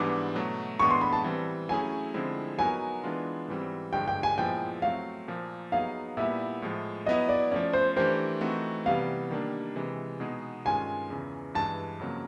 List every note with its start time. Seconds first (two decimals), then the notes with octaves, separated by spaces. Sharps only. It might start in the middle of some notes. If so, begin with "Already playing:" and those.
Already playing: G#2 E3 G3 B3 D4 D6
0.35 B2 F#3 A3
0.79 A2 E3 G#3 B3 D4 C#6
0.91 C6
1.01 B5
1.13 A5
1.24 E3 G3 C4
1.69 F#3 A3 C#4 E4 G#4 G#5
2.14 D3 F3 G#3 C4 E4
2.59 F#3 B3 D#4 F#4 A#4 G#5
3.04 E3 G#3 B3 D4 F4
3.48 G#2 E3 G3 C4
3.93 G2 D3 F3 G#3 G5
4.08 G5
4.23 G#5
4.38 A#2 F3 G#3 B3 E4 G5
4.82 F#3 A3 C4 F5
5.28 A#2 F3 A#3
5.72 F#3 B3 D#4 G#4 F5
6.17 A#2 G3 B3 E4 E5
6.62 A2 F3 G#3
7.06 F#3 B3 E4 D#5
7.29 D5
7.51 F3 A3 C#4 D5
7.73 C5
7.96 E3 A3 D4 G4 A#4 C5
8.41 E3 A3 C4 D#4 F#4
8.86 C3 E3 G3 B3 F5
9.31 D#3 G3 A#3 D4
9.75 C3 E3 G#3
10.20 B2 G#3 B3 D#4 G#4
10.65 G2 D#3 G#3 C#4 F4 G#5
11.10 E2 C#3 E3
11.54 G2 E3 G#3 A5
12.00 F2 C#3 F#3 A#3